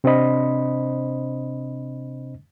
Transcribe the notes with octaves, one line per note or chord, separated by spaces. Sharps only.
C3 C4 D4 C5 D#5 B5